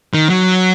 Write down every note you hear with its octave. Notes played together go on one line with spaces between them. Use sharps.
D#3
F#3